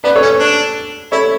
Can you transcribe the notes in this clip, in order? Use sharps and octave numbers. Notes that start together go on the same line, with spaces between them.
B3 B4 D5
A4 C#5
C#4
D4
E4 A4 C#5